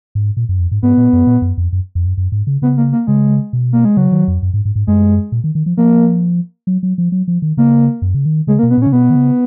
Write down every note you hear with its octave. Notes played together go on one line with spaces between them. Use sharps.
G#2
A#2
F#2
F2
G#2
G#2 B3
A#2
F#2
A#2
F#2
F2
F#2
F2
F#2
F#2
G#2
C#3
C#3 B3
A#3
A#3
C#3 G#3
B2
A#3
G#3
C#3 F#3
D#3
F2
F#2
G#2
G#2
G#2
F#2 G#3
A#2
D#3
D#3
F3
F3 A#3
F#3
F#3
F3
F#3
F3
D#3
C#3 A#3
F#2
C#3
D#3
C#3 G#3
A#3
B2
B3
A#2 C#4
C#3
B2 B3
D#3
C#3